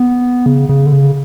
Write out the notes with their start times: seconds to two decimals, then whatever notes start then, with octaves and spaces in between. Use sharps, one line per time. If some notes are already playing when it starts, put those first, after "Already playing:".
Already playing: B3
0.46 C#3
0.69 C#3
0.86 D3
0.92 C#3